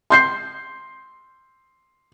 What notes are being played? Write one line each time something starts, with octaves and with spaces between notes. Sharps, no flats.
C6 G6 C7